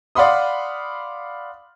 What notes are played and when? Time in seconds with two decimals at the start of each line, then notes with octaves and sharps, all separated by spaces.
0.15 D5 F5 F#5 B5 C6 D#6